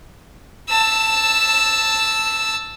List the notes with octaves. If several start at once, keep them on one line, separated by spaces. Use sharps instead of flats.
A5 E6